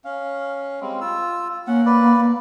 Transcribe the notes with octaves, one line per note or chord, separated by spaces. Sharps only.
C#4 F5
G3 G#3 C4
F4 E6
A#3 C#4 F#5
B4 D5